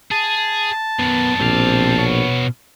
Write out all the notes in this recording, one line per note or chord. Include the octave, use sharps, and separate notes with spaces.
G#4 A5
F#2 D#3 B3
A#1 B2 C4 G4 F5
B3 C#5